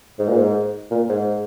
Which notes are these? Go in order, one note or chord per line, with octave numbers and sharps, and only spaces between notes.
G#2
A#2
G#2
A#2
G#2